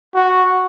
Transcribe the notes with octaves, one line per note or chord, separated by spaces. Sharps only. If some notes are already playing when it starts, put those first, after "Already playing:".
F#4